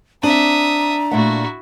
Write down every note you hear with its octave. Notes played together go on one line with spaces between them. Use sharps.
C4 D4 E5 A#5 D#6
A#2 A3 E4 F#4 F#5